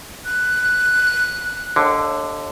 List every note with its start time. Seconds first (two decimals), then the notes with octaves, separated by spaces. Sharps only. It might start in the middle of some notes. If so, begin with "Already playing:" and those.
0.25 F#6
1.76 D#2 D3